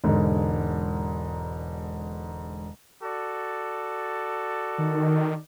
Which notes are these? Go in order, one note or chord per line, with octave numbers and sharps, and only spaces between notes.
E1 G#2 D3
F#4 A4 D5
D#3